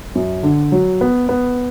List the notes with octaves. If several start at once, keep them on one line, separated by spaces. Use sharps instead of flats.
F#2
D3
F#3
B3
B3